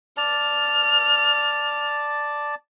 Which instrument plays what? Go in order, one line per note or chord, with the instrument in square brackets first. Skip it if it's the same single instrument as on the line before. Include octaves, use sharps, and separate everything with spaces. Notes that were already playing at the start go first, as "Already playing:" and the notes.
[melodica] D5 A5 [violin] F6